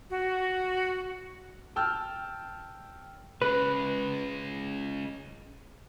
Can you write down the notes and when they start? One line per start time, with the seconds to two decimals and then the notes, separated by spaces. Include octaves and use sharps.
0.10 F#4
1.76 G5 A5 E6 F6
3.42 C#3 G#3 B4